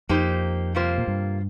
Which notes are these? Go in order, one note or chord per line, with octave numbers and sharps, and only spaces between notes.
F2 A#3 D#4 G4 C5
C3 G3 A#3 F4 C5
A#2
G2